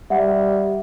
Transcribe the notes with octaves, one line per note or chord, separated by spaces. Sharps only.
G3 E5 F#5